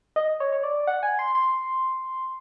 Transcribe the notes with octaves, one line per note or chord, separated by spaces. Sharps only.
D#5
C#5
C#5
D5
F#5
G#5
C6
C6